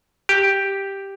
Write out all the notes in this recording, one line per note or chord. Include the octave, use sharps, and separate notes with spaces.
G4